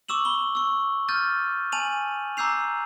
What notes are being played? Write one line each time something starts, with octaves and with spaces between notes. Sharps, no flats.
C#6 D6 E6 E7 F#7
B5 G7
C#6 E6
F6 G6 A6 D#7
G#5 A5 D#7 F7 F#7
A#5 D6 E6 G6 C7 F7